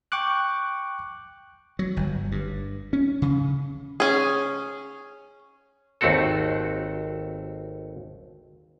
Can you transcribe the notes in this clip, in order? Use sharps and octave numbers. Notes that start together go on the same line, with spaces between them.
G5 C#6 D6 F#6
F#3
G1
G2
C#4
C#3
C#4 G#4
G#1 D#2 A3 C4 F#4 A4